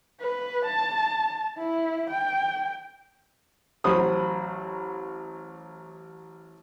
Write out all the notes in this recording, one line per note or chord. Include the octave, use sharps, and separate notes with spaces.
B4
A5
E4
G5
A1 F#3 C5 B5 D#6